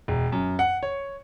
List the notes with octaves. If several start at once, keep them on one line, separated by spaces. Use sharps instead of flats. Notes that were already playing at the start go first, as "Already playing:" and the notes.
E1
F#2
F#5
C#5